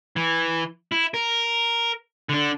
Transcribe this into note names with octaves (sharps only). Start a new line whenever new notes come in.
E3
E4
A#4
D3 D4